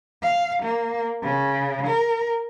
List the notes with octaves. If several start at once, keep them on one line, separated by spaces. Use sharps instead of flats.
F5
A#3
C#3
A#4